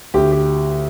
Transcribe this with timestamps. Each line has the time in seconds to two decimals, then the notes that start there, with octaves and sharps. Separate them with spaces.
0.14 D2 G4
0.32 G4